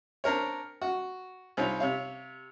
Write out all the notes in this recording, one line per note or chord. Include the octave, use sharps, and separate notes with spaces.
C4 D4 A#4 C#5
F#4
C2 C4 D#4 F4 C#5
C3 C#5 F5